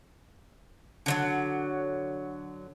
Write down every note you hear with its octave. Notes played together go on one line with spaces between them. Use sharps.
D3 F3 F#3